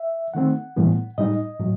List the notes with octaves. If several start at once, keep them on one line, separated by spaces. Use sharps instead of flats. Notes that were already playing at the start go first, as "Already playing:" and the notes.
Already playing: E5
D#3 A3 C4 F#5
A2 E3 G3 B3
A2 G3 D#4 D#5
A2 F#3